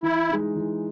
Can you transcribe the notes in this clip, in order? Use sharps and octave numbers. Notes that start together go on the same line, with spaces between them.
E3 E4
G#3 D#4
E3